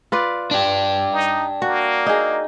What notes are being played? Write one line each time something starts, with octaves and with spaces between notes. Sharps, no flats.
F4 B4 D5
D4 G4
D#4
A#3 F#4
D#4 G#4